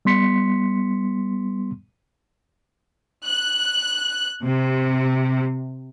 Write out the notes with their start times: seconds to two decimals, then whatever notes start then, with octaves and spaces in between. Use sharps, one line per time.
0.05 G3 B3 C6 B6 C#7
3.26 F#6
4.44 C3